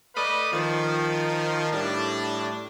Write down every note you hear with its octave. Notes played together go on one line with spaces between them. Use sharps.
A3 B4 D5 D#5 F5 B5
D#3 F3
A2 G3 D4